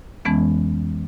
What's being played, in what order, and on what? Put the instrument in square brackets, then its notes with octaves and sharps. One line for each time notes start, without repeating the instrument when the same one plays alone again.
[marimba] F2 E3 G#3 B3 C#4